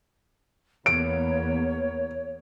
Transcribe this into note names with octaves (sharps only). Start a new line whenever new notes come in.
E2 A#3 B3 C#5 D7